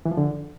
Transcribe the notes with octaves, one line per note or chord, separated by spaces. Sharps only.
E3
F3
D3